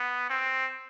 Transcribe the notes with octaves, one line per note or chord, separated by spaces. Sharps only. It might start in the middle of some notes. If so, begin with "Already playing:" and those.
Already playing: B3
C4